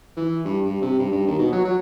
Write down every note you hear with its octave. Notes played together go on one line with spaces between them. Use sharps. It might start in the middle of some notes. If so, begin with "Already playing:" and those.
E3
G2
G2
C3
G2
G2
D#2
B2
F#3
F#3